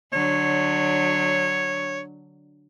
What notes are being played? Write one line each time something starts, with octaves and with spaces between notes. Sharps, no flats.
D3 F#3 C#5